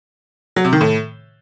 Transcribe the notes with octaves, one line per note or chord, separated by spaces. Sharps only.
F#3
C3
D#3
A2